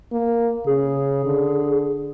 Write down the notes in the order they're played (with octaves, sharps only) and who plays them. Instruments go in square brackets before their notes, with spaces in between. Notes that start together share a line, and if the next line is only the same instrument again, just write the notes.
[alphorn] A#3
[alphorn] C#3 [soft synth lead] G#4
[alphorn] D3